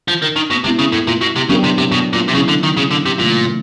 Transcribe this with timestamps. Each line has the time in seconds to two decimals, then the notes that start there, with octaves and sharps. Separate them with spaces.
0.08 F3
0.22 D#3
0.36 D#3
0.51 B2
0.64 C3 G#3 B3 E4
0.79 C#3
0.93 A2
1.07 A#2
1.21 B2
1.36 C3
1.49 C#3 F#3 B3 D4 G4 A#4
1.64 C3
1.78 C3
1.92 B2
2.13 A#2
2.28 C3
2.34 C#3 F#3 A#3 C#4 E4
2.48 D3
2.63 D#3
2.77 C#3
2.91 D3
3.05 C3
3.19 A#2 C#3 E3 A3 C4